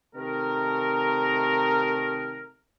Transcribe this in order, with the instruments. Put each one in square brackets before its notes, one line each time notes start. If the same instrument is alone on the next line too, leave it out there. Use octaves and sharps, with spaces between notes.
[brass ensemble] C3 D#3 A3 A#4